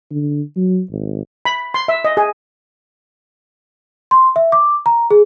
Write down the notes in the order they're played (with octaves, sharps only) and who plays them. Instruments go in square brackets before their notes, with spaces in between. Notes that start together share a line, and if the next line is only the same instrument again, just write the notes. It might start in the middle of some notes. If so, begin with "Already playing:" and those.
[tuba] D3
F#3
G#1
[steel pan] B5
C6
E5
D#5
G#4
[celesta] C6
E5
D6
A#5
G#4